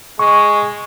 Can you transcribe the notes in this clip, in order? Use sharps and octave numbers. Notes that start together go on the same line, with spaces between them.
G#3 C#6